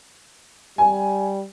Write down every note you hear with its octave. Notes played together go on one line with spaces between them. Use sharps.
G3 G#5